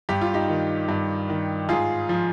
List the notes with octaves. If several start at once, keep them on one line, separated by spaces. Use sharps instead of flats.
G2 G4
F4
D#4 G4
D#3
G2
D#3
G#2 F4 G#4
F3